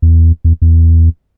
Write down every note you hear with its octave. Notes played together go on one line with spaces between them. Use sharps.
E2
E2
E2